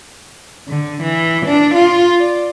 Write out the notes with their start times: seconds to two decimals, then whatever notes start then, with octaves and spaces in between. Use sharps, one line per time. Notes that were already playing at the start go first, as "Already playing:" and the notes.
0.69 D3
1.03 E3
1.45 D4
1.75 F4
2.19 D5